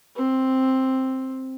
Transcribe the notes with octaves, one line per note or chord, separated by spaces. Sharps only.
C4